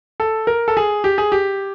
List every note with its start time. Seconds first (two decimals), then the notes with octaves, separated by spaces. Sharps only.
0.20 A4
0.47 A#4
0.68 A4
0.77 G#4
1.04 G4
1.18 G#4
1.32 G4